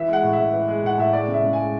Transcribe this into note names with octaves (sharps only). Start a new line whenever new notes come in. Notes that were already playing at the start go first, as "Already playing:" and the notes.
Already playing: E3 E5
G#3 F#5
A2
E5
A2
E3
G#3
A2 F#5
A2 E5
G#3 D5
C#3
E5
C#3
G#5
G#3